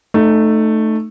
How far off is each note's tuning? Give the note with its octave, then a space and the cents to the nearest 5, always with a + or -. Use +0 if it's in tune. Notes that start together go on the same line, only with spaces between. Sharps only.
A3 +0 D#4 -25